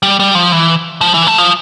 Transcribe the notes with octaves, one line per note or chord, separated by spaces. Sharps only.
G3
G3
F3
E3
F3
E3
A3
F3